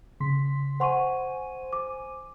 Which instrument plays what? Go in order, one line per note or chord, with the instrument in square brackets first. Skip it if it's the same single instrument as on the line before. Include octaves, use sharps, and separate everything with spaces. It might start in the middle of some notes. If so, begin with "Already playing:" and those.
[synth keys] C#3 C6 B6
[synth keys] C5 G#5 D#7 [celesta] F#5 C6 C#6
[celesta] D6